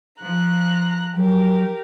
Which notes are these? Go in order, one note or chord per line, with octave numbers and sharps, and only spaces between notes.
F3 A#5 F#6
F#3 G4 A#4